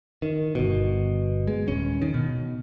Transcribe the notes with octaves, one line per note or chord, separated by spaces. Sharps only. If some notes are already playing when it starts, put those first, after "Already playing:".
D#3
G1 B2
G#3
D#1 C#4
D#3
B2